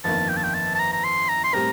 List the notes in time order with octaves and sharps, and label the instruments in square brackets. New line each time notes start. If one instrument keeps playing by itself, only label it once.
[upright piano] G1 F2 D#3 A#3 [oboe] A5
[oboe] G5
A5
G5
A5
A5
A#5
A#5
C6
A#5
C6
[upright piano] A2 G3 C4 G4 A#4 [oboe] A#5